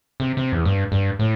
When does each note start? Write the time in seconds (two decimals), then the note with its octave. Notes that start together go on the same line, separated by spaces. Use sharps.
0.20 C3
0.37 C3
0.52 E2
0.65 G2
0.92 G2
1.19 A2